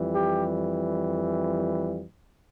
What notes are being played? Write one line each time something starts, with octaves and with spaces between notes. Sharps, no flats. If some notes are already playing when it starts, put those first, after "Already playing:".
Already playing: F2 E3 G3
G4